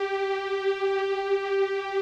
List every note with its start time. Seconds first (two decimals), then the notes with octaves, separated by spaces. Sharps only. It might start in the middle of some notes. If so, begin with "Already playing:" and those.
Already playing: G4
1.19 G4